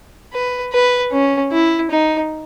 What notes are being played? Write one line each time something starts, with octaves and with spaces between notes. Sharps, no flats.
B4
B4
C#4
E4
D#4